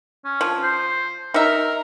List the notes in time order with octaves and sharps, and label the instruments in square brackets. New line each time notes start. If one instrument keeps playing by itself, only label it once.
[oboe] C#4
[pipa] F3
[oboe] C5
[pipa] D#4 E5 [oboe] A#4